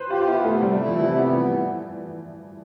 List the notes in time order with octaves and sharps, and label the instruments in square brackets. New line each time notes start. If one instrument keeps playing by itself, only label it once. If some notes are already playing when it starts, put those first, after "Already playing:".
Already playing: [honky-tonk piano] B4 C5
[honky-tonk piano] F4 [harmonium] G4
[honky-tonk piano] F4
[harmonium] B3 [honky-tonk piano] E4
[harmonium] C3 [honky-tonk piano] A3
[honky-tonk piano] G3 [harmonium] A3
[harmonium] E4
[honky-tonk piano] F3
[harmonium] C3 [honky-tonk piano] E3
[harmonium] B3